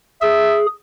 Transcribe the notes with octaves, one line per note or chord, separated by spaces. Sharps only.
G#4 E5